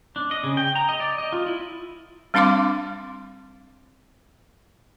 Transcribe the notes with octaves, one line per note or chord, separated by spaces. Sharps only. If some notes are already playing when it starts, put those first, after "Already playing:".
D4
D#5
C#3
G5
A#5
D#5
D5
D#5
F4
E4
G3 C4 D4 F5 C6 D6